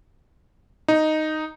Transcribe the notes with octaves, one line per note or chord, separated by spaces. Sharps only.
D#4